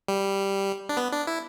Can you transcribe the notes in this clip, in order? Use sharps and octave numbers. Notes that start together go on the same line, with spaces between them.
G3
D4
B3
D4
E4